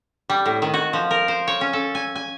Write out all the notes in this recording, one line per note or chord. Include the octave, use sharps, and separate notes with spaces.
G3
A2
D#3
F#4
F3
A#4
C5
C#5
C#4
A4
G#5
G#5